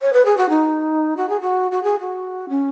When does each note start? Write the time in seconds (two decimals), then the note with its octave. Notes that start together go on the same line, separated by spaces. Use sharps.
0.02 C#5
0.13 B4
0.25 G#4
0.37 F#4
0.49 D#4
1.17 F#4
1.29 G#4
1.41 F#4
1.72 F#4
1.84 G#4
2.00 F#4
2.49 C#4